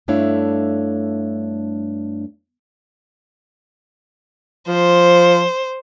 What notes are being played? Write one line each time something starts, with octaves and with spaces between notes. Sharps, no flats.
G2 A3 D4 E4 C#5 F5
F3 C5